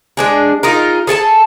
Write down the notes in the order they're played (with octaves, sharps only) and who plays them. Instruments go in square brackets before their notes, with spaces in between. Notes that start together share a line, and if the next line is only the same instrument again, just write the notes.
[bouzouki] G#3 D4 G#4
D#4 F4 G#4 A#4
G#4 A4 G#5 A5